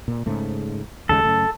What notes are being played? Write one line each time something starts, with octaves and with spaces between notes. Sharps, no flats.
A#2
G#2 C#3 A3
D#2 C#3 G#3 A4
F#2 C#3 A3